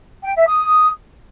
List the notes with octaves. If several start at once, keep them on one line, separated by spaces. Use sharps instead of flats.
G5
E5
D#6